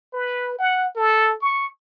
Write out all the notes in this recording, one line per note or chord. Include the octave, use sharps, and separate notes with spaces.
B4
F#5
A4
C#6